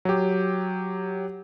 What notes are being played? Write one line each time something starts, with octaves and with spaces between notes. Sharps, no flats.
F#3 G4